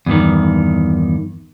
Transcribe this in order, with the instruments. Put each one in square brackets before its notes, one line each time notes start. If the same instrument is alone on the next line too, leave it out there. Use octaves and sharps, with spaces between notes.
[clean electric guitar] E2 G2 D#3